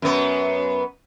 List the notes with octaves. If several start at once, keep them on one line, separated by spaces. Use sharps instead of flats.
F#2 B3